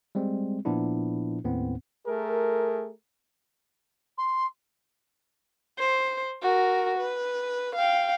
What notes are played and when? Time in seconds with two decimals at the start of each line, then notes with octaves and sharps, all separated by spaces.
0.15 G3 G#3 C4
0.65 A#2 F3 B3 D4 E4
1.44 D#2 A2 B3 C4
2.07 A3 G#4 A#4
4.17 C6
5.79 C5
6.42 F#4 A#4
6.98 B4
7.75 F5 G5